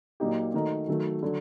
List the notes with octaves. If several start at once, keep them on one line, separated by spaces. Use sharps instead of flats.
A#2 F#3 A#3 D#4 G4
D#3 A3 D#4 F#4 A#4
D#3 F#3 A3
D3 F#3